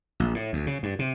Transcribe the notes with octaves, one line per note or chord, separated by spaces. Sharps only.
A#1
A2
D2
C#3
G2
C3